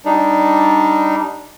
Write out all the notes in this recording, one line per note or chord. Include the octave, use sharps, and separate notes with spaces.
G3 D4 D#4